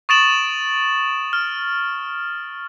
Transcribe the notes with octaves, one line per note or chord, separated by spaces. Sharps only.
C#6 D#6 A6 D7 E7 F#7
F6